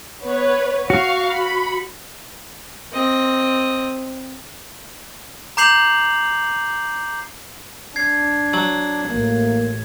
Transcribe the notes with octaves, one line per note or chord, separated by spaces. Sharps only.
B3 B4 C#5
F#4 F5 C#6
B5
C4 D#5
A#5 D6 G6 C7 F7 F#7
D4 G#6 C7
F#3
A1 A#3